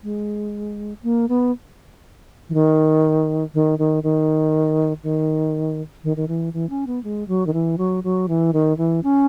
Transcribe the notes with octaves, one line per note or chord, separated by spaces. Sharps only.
G#3
A#3
B3
E3
D#3
D#3
D#3
D#3
D#3
D#3
D#3
E3
E3
C#4
B3
G#3
F#3
D#3
E3
F#3
F#3
E3
D#3
E3
C#4